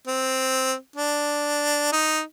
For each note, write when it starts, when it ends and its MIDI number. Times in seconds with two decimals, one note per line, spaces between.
0.07 0.74 60
0.96 1.88 62
1.93 2.21 63